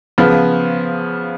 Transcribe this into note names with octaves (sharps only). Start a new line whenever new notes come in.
C#3 F3 B3